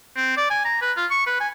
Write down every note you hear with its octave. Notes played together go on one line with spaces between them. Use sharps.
C4
D5
G#5
A#5
B4
F4
C#6
B4
G#5